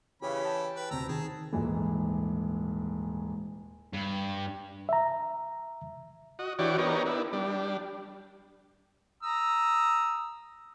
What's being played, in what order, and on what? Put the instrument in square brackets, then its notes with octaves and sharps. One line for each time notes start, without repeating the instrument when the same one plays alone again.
[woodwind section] C#3 [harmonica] E3 C#4 B5 [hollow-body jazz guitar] G4 C#5
[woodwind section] G5 A5
[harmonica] B4
[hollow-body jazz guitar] D2 C3 [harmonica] A#5 E6
[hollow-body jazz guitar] D#3 [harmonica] G#4 [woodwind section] A5
[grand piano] D#1 G#2 E3
[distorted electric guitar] G2
[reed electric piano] E5 A#5
[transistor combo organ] F#4 D#5
E3 D4 F#4 G4 C#5 D5
B3 D4 D#4 G4 A#4 C#5
B3 D4 E4
G3 D4
[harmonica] A#5 D#6 E6